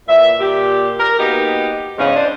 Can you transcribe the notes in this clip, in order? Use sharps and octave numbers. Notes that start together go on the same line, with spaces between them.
A#2 E3 E5
A#2 G4
A#4
A#3 B3 D#4 F#4 G4
E2 G#2 C#3 C#4 D#5
D4 C5